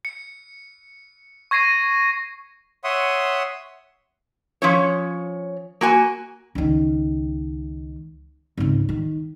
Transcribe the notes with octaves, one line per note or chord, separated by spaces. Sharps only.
C#7
C#6 G#6 A#6 C7 D#7
C#5 E5 F#5 C6 D#6
F3 C#4 C#5
A#3 F#4 G#5
C#2 D#3
G#1 C#2
D#3